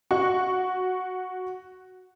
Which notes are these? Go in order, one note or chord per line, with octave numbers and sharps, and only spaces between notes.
F#4 C#6